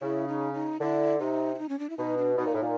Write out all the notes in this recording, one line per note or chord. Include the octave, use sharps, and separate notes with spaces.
C#3 E4
D#4
D#4
D3 E4
C3 D#4
E4
D#4
C#4
D4
E4
B2 D#4
D4
B2 D#4
A#2
A2
A#2